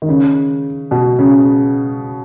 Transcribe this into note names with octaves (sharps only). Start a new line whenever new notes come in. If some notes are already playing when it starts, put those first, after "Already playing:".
D#3
C#3
B2
C#3